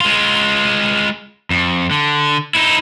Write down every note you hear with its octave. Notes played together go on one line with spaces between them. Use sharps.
G#3 F4
F2
D3
D#4 E4